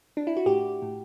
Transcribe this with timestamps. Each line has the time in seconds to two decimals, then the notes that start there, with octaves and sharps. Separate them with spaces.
0.17 D4
0.27 E4
0.37 F#4
0.46 A2 G4
0.82 A2